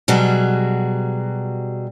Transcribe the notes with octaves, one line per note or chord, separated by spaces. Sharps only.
B2 F#3 G3 F#4 G#4